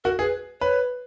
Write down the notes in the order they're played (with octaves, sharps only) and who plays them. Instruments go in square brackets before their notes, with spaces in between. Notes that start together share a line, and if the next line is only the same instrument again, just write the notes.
[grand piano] F#4 [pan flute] A#4
[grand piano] G#4 [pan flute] B4
[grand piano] B4 [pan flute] C#5